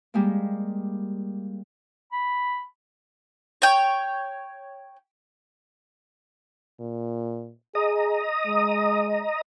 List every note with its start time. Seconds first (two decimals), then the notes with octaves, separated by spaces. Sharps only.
0.14 G3 G#3 A#3
2.12 B5
3.62 C#5 G5
6.80 A#2
7.75 G#4 D#5 A#5 D#6
8.47 G#3